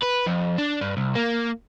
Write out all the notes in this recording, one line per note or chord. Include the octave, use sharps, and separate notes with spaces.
B4
F2
D4
G2
C2
A#3